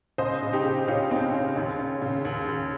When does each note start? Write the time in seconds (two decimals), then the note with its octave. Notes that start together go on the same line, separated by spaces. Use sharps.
0.18 C#2 C5 D#5
0.42 C#3
0.53 D#4 G4
0.65 C#3
0.87 C#2 C#4 F4
1.11 C#2 C4 D#4
1.33 C#3 C#4
1.56 D#2 C#4
1.79 C#3
2.02 C#3
2.25 D#2
2.48 D#2